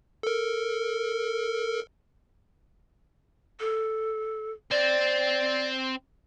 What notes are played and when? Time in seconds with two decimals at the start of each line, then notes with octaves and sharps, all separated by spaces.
0.23 A4 A#4
3.60 A4
4.71 C4 C5 D5